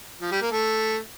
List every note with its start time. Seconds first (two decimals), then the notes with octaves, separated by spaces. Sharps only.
0.21 F3
0.31 G3
0.42 A#3
0.52 A3